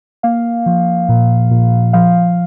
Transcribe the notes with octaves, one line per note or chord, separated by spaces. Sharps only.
A#3 F5
F3
A#2
A#2
F3 F5